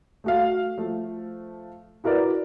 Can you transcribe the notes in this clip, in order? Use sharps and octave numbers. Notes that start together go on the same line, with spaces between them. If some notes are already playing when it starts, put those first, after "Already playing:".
A3 F#4 F5
F3 A3
E4 F#4 A#4 B4 D5